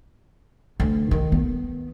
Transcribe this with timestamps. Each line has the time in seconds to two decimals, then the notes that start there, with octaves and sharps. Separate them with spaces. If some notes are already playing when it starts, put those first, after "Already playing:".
0.80 D2
1.11 D#3
1.32 B3